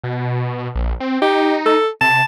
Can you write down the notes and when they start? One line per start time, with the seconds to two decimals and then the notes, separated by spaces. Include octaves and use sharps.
0.03 B2
0.75 A#1
1.00 C4
1.22 D#4 G4
1.66 A4
2.01 C3 A5